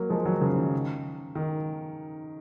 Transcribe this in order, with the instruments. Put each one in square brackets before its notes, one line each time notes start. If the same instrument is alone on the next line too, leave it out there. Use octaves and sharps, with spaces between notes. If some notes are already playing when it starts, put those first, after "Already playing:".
Already playing: [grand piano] F#3 A#3
F3 G#3
D#3 F#3
C#3 F3
D#3
D#3